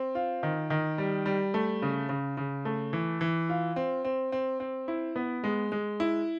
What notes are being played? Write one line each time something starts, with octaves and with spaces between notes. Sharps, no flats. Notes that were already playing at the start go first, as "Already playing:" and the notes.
Already playing: C4
F4
D#3
D#3
G3
G3
A3
C#3
C#3
C#3
A3
E3
E3
F4
C4
C4
C4
C4
E4
B3
G#3
G#3
E4